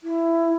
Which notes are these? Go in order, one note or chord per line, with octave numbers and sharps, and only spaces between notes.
E4